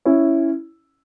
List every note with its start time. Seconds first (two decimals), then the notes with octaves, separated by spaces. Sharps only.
0.05 C#4 E4